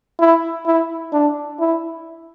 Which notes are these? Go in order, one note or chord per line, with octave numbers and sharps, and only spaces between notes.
E4
E4
D4
E4